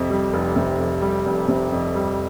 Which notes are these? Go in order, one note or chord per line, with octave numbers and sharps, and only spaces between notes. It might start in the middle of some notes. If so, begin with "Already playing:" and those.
Already playing: F2 C3
G3
F1
C3
F2
G3
F1
C3
F2
G3